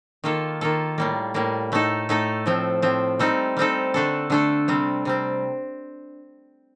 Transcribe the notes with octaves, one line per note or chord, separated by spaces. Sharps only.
D#3 A#3 F4 A4
D#3 A#3 F4 A4
A2 G3 A#3
A2 G3 A#3
A2 A3 D#4 A4
A2 A3 D#4 A4
A2 F3 C4
A2 F3 C4
G3 C4 D#4 A4
G3 C4 D#4 A4
D3 A3 D4 A4
D3 A3 D4 A4
C3 G3 C4
C3 G3 C4